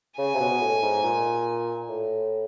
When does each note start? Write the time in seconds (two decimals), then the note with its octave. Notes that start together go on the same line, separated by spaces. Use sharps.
0.17 C#3 G#5
0.34 C3
0.40 B2
0.61 A2
0.82 G#2
1.03 A#2
1.89 A2